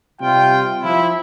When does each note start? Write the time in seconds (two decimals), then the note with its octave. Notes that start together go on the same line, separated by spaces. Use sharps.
0.21 C3 G3 F4 G5
0.82 F3 E4